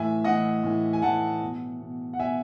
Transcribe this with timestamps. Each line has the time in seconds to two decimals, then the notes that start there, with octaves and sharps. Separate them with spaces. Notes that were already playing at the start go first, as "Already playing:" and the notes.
Already playing: A2 E3 E5 G#5
0.24 A2 E3 D#5 F#5
0.64 A2 E3
0.93 G#5
1.02 A2 E3 F#5 A5
1.41 B2
1.80 B2
2.13 F#5
2.19 B2 E5 G#5